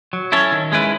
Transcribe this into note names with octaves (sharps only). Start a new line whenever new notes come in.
F#3
C#4 E4 A4 C#5
D#3
G#3 C#4 E4 B4